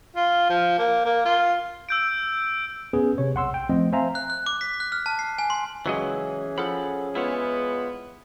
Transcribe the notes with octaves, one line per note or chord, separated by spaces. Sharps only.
F4
F3
A#3
A#3
F4
E6 G6 D7
B3 C#4 G#4 B4
C3 C#5
B1 F#5 C6 E6
G5
F3 A3 C4 D#5
C5 E5 F5 G#5 A#5
F#6
F#6
D6
B6
F#6
F6
A5
C7
G#5
C6
C#2 E3 F#3 C#4 G#4 D#5
F3 A4 F#5 B5
G#3 B3 E4 F4 C#5